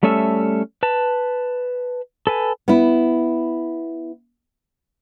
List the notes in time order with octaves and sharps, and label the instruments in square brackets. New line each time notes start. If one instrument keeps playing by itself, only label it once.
[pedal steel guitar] G3 A3 C#4 A4 E5
B4 A5
A4 B4 G#5
[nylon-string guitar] B3 E4